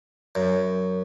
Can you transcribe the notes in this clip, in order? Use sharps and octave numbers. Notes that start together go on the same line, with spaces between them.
F#2